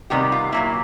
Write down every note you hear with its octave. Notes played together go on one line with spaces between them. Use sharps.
C3 D#3 G3 B3 G4
F4
A#2 F#3 A#3 E4